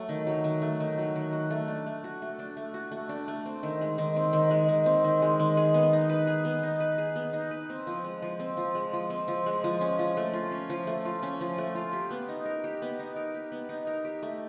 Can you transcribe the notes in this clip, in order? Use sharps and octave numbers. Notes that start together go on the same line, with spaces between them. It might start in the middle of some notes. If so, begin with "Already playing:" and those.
Already playing: F#3 A3
D#3
F#3
D#3
A3
D#3
F#3
D#3
F#4
A3
D4
A3
F#4
A3
D4
A3
F#4
A3
D4
A3
C4
D#3
G#3
D#3
C4
D#3
G#3
D#3
C4
D#3
G#3
D#3
G#4
B3
D#4
B4
G#4
B3
D#4
B4
G#4
B3
D#4
B4
C4
F3
G#3
F3
C4
F3
G#3
F3
C4
F3
G#3
F3
C#4
F3
A3
F4
C#4
F3
A3
F4
C#4
F3
A3
F4
G4
B3
D#4
A#4
G4
B3
D#4
A#4
G4
B3
D#4
A#4
G4
A3